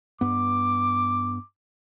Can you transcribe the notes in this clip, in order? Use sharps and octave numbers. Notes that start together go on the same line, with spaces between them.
G2 B3 D6